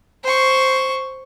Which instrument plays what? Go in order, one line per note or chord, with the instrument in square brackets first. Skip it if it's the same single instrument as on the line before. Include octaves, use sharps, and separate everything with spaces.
[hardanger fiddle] C5 C#6